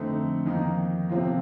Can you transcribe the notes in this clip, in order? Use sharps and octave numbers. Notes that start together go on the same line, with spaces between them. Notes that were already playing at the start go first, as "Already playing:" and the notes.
Already playing: F2 D3 A3 C4 D#4
F2 D#3 A#3 D#4
C3 F3 C4 F4